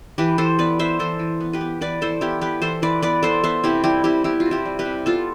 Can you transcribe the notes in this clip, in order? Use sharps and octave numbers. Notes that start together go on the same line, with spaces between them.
E3 G4 B4
E3 A4 C5
B3 B4 D5
B3 C5 E5
E3 A4 C5
E3
B3
G4 B4
B3
E3 B4 D5
E3 A4 C5
B3 E4 G4
B3 G4 B4
E3 A4 C5
E3 B4 D5
B3 B4 D5
B3 A4 C5
B3 C5 E5
C3 E4 G4
G3 E4 G4
C3 E4 G4
B3 E4 G4
F4
C3
E4 G4
G3
G4 B4
C3
B3 F4 A4